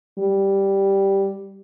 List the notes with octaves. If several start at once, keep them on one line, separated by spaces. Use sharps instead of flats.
G3